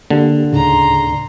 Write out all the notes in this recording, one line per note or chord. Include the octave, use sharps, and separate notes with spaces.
D3 A#3 G4
D2 A2 C#3 D#4 A#5 C6